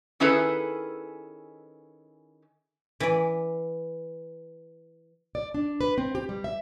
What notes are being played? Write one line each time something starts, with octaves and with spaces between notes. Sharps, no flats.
D#3 C#4 E4 G#4 A4 B4
E3 D5
D5
D4
B4
C4
G4
G3
E5